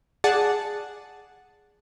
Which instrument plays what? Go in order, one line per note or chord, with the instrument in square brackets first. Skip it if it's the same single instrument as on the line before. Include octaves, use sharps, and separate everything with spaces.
[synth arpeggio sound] G#4 D5 F#5 A5